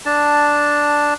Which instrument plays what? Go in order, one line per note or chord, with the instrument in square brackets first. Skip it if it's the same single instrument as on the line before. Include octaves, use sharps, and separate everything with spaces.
[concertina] D4 A5